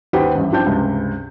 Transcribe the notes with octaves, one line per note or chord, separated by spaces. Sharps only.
D#2 G4 B4 C5 F#5 G5
A1 G2
F3 C4 D4 G5 A5 G6
C#2 G2 C3